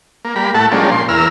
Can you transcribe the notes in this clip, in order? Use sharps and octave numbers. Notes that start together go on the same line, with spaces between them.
A#3
G3 A#3 B5
A2 A3 F#5 A5
F3 G3 G#3 A#3 C#4 D4
A#2 C6
E2 A#4 E6 F6